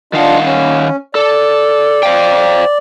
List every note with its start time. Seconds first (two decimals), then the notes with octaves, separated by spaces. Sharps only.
0.13 D#3 D4 F4 D#5 F5 F#5
0.44 C#4
1.15 A4 D5
2.03 C5 F5 G5